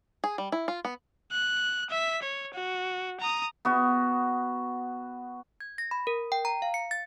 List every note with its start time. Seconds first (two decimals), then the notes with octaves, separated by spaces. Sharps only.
0.24 G#4
0.38 G3
0.52 E4
0.68 F4
0.85 B3
1.32 F#6
1.90 E5 B6
2.22 C#5
2.54 F#4
3.21 A#5 D#6
3.65 B3 F#4
5.60 G#6
5.78 A#6
5.91 B5
6.07 A#4
6.32 G5
6.45 A#5
6.62 F5
6.74 C#7
6.91 A6